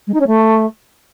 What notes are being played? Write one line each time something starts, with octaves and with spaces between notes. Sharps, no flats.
G#3
D#4
C#4
A3